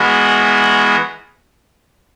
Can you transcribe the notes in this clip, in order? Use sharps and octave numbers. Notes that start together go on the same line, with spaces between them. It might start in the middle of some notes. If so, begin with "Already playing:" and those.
Already playing: E3 G#3 B3 F#4 A#4